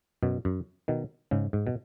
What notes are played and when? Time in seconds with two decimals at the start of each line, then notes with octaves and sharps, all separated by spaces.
0.23 F#2 B2
0.45 F#2
0.88 B2 D#3
1.31 G#2 C#3
1.53 G#2
1.67 B2